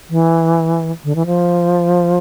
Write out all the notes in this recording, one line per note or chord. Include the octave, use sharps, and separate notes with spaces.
E3
D3
E3
F3